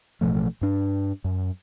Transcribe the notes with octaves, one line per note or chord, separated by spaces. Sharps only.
A1 B2 F3 A3
G2 D4
F#2